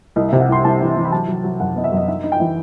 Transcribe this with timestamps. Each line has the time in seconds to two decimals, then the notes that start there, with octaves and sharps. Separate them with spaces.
0.16 C2 D#5
0.29 E5
0.33 C3
0.40 F#5
0.49 C2 C6
0.64 C2 A5
0.81 E3
0.96 E3
1.05 B5
1.12 F#3 A5
1.28 F#3
1.44 F#3
1.60 F#2 F#5
1.75 B3 D#5
1.84 E5
1.92 F#2
1.97 D#5
2.08 D#4 E5
2.24 D#4
2.32 G5
2.40 E3